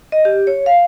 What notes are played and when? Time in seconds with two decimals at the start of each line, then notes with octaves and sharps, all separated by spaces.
0.12 D#5
0.25 G4
0.47 C#5
0.66 F5